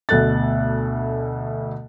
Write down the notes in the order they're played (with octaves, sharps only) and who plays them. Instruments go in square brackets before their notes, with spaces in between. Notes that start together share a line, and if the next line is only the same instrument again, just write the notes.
[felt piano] D2 B2 A4 F#6 A6